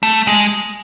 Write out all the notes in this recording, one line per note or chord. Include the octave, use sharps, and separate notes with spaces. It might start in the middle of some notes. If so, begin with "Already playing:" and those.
A3
G#3